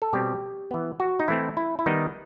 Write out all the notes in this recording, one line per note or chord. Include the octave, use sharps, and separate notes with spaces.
A4
B2 G3 C4 G4
E3 B3
F#4
D#4
E3 A3 C4 E4
E4
E4
D#3 G3 B3 D#4